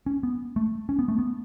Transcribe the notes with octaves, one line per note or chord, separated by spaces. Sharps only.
C#4
B3
A3
C#4
B3
A3
B3